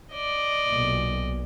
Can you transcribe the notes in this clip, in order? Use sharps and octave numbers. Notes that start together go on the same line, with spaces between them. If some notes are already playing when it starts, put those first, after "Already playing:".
D5 D#5
B1 A#2